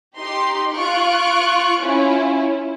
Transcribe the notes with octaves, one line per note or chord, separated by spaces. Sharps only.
D#4 G4 C6
F4 C#6 F#6 D7
C#4 E4 F4